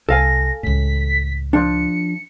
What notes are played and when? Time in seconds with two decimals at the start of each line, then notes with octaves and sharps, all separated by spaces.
0.09 C2 A4 F5 G#5 A#6
0.63 C#2 A2 B6
1.53 F3 D4 C#7